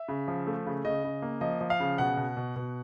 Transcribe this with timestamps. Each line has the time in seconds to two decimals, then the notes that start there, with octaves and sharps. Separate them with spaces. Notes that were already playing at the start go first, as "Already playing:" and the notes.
Already playing: E5
0.08 C#3
0.28 F3
0.47 A3
0.66 C#3
0.85 C#3 D#5
1.04 C#3
1.22 A#3
1.41 F3 D#5
1.61 F3
1.70 F5
1.80 C#3
1.98 B2 F#5
2.17 B2
2.37 B2
2.56 B2